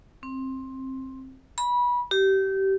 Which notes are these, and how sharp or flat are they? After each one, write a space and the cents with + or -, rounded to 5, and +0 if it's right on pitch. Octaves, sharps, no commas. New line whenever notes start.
C4 +15
B5 -25
G4 -25